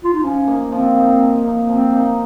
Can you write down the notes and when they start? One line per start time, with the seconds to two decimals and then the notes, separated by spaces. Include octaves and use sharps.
0.04 F4
0.14 D#4
0.24 F3 C#4
0.47 A#3 D#4
0.72 F3 C4
0.96 A#3 D#4
1.20 F3
1.44 A#3 D#4
1.69 F3 C4
1.93 A#3 D#4